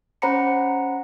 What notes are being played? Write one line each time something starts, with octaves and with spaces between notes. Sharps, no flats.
C#4 C5 F#5 A#5 B5 C#7